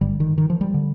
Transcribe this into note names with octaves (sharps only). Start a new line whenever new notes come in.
G1 G2 D3 G3
D#3
D#3
F3
G3
D3